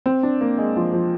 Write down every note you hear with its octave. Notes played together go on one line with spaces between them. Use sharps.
C4
D4
A#3
G#3
F3
F3